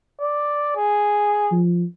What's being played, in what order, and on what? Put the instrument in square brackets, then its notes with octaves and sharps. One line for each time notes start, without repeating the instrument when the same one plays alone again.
[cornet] D5
G#4
[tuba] F3